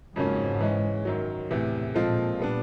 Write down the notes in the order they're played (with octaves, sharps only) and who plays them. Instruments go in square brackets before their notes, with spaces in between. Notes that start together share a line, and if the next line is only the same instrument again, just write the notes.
[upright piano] F2 C#3 F#3 A#3 C#4 [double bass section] G#2
[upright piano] E3 G#3 C#4
F#2 D#3 F#3
[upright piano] E2 C3 E3 [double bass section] A2
[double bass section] A#2 [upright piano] F3 G#3 C4 F4 A4
[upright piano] G3 B3 D4